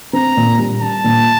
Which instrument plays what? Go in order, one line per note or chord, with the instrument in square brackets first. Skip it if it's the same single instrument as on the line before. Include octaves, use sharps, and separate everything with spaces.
[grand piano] C4 [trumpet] A#5
[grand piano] A#2
G3
[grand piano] G3 [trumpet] A5
[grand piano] A#2